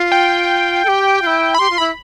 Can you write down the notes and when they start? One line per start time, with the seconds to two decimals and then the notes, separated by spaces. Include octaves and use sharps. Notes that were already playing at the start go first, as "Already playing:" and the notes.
Already playing: F4
0.12 G5
0.85 A4
0.88 G4
1.22 F4
1.27 E4
1.54 B5
1.59 G4 C6
1.70 F4
1.78 E4 B5